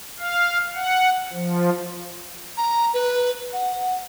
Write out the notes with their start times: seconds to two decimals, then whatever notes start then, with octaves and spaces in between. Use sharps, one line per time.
0.19 F5
0.75 F#5
1.33 F3
2.57 A#5
2.94 B4
3.53 F#5